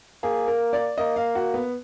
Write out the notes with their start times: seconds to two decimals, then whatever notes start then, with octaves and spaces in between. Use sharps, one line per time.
0.23 A#3 G#4
0.48 A#4
0.73 D5
0.98 A#3 D#5
1.16 F5
1.35 F#4
1.54 B3